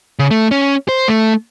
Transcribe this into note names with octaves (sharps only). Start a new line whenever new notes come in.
C#3
A3
C#4
C5
A3